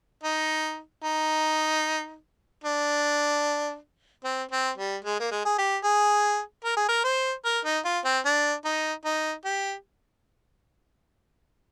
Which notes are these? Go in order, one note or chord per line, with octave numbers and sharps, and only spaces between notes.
D#4
D#4
D4
C4
C4
G3
G#3
A#3
G#3
G#4
G4
G#4
A#4
G#4
A#4
C5
A#4
D#4
F4
C4
D4
D#4
D#4
G4